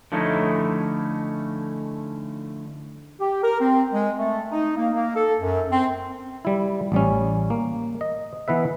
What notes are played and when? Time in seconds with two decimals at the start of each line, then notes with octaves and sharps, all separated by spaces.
0.12 D3 F3 A3 C#4 D#4 E4
3.20 G4
3.43 A#4
3.61 C4
3.93 G#3
4.19 A3
4.52 D#4
4.77 A#3
4.95 A#3
5.15 A4
5.40 F#2
5.71 C4
6.45 G3 E4
6.92 A1 G3 C#4
7.50 A#3
8.01 D#5
8.48 E3 B3 B4 E5